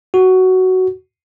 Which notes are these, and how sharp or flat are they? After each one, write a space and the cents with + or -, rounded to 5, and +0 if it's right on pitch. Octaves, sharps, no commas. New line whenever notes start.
F#4 +10